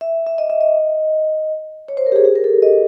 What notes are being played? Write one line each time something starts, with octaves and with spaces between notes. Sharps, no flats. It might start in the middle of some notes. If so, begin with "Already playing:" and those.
E5
E5
D#5
E5
D#5
C#5
C5
A#4
G4
G#4
G4
A#4
A4
D#5